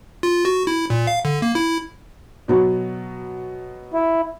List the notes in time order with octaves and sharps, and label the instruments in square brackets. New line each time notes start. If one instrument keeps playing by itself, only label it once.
[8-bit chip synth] F4
F#4
E4
A#2
F5
D3
A#3
E4
[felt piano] B2 F#3 B3
[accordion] E4